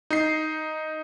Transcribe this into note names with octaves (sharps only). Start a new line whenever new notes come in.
D#4 C7